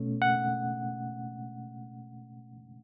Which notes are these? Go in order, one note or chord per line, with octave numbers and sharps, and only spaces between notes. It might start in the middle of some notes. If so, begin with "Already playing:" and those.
Already playing: B2 A3 C#4
F#5